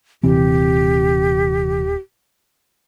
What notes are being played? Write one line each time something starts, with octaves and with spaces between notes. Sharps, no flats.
D#1 C3 E3 C4 G4